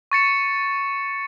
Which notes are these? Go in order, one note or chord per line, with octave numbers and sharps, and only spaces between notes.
C#6 A6 C#7 E7